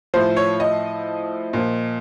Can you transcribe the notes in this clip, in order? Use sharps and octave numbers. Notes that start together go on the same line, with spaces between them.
A2 F3 C5
C#5
D#5
A#2 F3